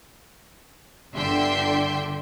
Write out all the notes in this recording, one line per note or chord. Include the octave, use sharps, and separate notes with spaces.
G1 D3 E5 G5 C6